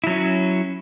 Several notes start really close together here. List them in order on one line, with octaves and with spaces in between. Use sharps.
E4 F#3 C#4